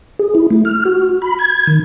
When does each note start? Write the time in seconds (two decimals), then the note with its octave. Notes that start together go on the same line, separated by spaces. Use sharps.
0.19 G#4
0.35 E4
0.50 A3
0.65 F6
0.85 F#4
1.22 B5
1.39 G#6
1.67 D#3